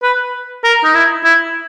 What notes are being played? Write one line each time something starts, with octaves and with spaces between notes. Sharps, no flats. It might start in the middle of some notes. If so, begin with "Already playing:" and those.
B4
A#4
D#4
E4
E4